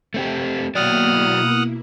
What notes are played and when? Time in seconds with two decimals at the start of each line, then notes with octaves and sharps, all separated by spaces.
0.14 A3 C4 G4
0.75 B2 F#3 A#3 E4 D5 F#5 D#6 F6